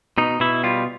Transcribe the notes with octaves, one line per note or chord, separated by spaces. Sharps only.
B2 D#4
B2 E4
G3 F4